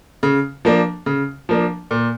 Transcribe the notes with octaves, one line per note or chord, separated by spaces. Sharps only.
C#3
F3 A#3 D4
C#3
F3 A#3 D4
A#2